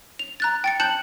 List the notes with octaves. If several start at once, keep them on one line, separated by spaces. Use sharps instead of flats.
F7
A#5 F#6 A6
G5 A6 C#7
A5 F#6 G6 C#7 F#7